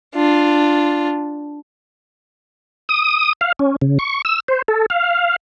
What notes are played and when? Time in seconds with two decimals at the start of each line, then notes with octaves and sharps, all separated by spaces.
0.15 D4 F4
2.89 D#6
3.41 F5
3.59 C#4
3.82 C#3
3.99 C#6
4.25 E6
4.48 C5
4.68 A4
4.90 F5